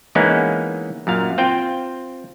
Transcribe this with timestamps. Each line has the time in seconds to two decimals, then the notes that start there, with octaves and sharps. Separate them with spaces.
0.15 E3 G#3 A#3 B3 C#4 D#4
1.07 F#2 A#2 F5
1.38 C4 F4 G5